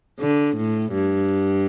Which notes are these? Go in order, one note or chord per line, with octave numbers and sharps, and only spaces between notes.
D3
A2
G2